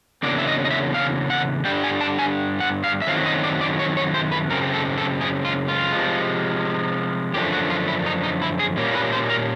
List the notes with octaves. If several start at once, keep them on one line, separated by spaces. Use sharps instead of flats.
E2 C#3 F#3 A#3 D4 D5
E5
D#5
D#5
E5
F5
F#5
G2 D3 G3 D4 G5
G#5
A5
G#5
F#5
F5
E5
F#2 D#3 F#3 A3 C4 F5
D#5
D5
D5
C#5
C#5
C5
B4
F#2 C#3 C4 A#4
A4
A4
G#4
F4
F4
C3 F3 G#3
F#2 D3 F3 A3 D4 G4
F#4
F4
E4
D#4
D#4
E4
G#4
A#2 G3 A#3 C#4
B4
C5
A#4